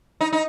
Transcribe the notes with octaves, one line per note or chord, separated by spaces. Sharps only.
D#4
D#4